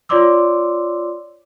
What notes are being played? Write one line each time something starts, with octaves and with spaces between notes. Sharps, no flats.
F4 C#5 D5 C6 D6 E6